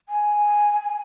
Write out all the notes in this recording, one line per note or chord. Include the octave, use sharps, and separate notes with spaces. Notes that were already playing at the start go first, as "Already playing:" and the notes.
G#5